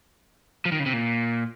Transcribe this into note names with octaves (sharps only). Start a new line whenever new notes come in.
F3
D#3
C#3
C3
A#2